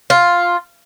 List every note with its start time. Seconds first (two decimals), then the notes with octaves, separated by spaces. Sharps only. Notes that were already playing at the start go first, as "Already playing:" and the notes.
0.10 F4